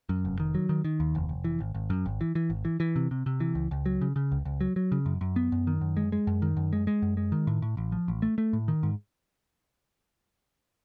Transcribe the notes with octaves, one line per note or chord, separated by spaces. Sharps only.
F#2
F1
D#3
F#3
D#3
D#3
D#2
F1
F1
E3
G#1
G#1
F#2
G#1
E3
E3
G#1
E3
E3
C3
C3
C3
E3
C#2
C#2
F#3
C#3
C#3
C#2
C#2
F#3
F#3
C#3
F#2
F#2
B3
F#2
D#3
F#2
G#3
G#3
F#2
D#3
F#2
G#3
G#3
F#2
G#3
D#3
A2
A2
A1
F3
A1
A3
A3
A2
D#3
G#2